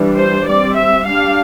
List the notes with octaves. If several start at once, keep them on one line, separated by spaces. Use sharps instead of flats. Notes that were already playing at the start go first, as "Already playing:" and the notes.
Already playing: E3 G3 D4
C5
G3 C4 D5
E5
G3 D4 F5